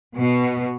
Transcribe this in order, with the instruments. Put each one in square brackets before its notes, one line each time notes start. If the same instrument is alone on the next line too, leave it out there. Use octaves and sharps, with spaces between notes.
[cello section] B2